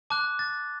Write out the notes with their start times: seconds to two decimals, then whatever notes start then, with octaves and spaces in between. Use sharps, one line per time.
0.10 A5 D6 F#6
0.39 A6